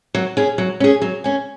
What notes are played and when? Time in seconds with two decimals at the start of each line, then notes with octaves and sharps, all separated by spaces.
0.15 F#3
0.37 C#4 G#4
0.58 F#3
0.80 C#4 G#4
1.02 F#3
1.24 C#4 G#4